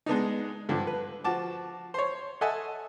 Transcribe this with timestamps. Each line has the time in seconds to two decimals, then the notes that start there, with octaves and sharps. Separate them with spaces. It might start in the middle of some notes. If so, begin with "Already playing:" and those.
0.06 G#3 B3 D4 D#4
0.69 G2 D3 F3
0.87 B4
1.24 F3 F#4 A5 D6
1.94 C5 C#5
2.41 A4 D#5 E5 F#5 G#5 A5